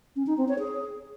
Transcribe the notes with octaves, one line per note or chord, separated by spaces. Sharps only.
C#4
D#4
C4
C#5
G#4